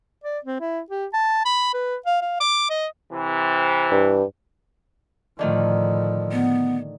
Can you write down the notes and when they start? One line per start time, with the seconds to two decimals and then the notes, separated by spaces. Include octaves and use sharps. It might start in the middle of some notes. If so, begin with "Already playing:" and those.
0.24 D5
0.45 C4
0.60 E4
0.90 G4
1.13 A5
1.45 B5
1.73 B4
2.06 F5
2.22 F5
2.40 D6
2.70 D#5
3.13 C3 E3
3.91 G2
5.39 A2 D3 D#3 F3 A3
6.32 B3